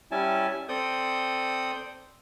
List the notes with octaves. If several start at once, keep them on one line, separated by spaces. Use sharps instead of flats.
G3 C#4 E4 G#5 A5
C4 A4 D5 D#6 G6